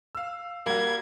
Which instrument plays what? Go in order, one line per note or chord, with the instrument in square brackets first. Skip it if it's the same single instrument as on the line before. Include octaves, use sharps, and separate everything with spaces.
[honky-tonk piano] F5 E6
[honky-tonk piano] G3 F#4 [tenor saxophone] A#3 [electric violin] G#6